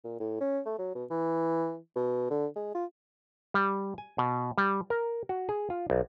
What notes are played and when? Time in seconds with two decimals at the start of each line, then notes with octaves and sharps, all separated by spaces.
0.04 A#2
0.20 A2
0.40 C#4
0.66 A3
0.79 F#3
0.95 B2
1.10 E3
1.96 B2
2.30 D3
2.56 G#3
2.75 F4
3.54 G3
3.98 G#5
4.18 B2
4.58 G3
4.90 A#4
5.29 F#4
5.49 G#4
5.70 F4
5.90 B1